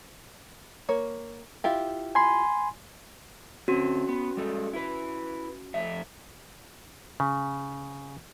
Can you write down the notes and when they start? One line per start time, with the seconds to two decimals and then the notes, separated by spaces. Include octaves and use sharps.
0.89 A#3 C#5
1.64 E4 F4 G4
2.15 G#5 B5 C6
3.68 D3 C4 C#4 F#4 C6
4.09 B3
4.37 G3 G#3 A4
4.73 E4 B4
5.74 F2 A3 E5
7.20 C#3